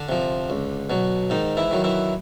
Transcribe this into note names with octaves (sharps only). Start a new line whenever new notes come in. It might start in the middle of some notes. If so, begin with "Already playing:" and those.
Already playing: D3 D4
C3 F3
C#2
B2 F#3
G#2 D#3 D#4
E3 E4
D#3 F#3
E3 E4